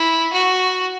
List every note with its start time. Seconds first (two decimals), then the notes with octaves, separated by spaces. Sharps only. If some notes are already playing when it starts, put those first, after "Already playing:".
Already playing: E4
0.33 F#4